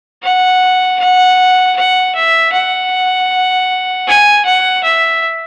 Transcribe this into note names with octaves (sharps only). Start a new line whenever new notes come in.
F#5
F#5
F#5
E5
F#5
G#5
F#5
E5